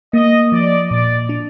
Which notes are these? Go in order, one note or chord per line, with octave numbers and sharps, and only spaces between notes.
A#3 D#5
F3 D5
A#2 D5
D4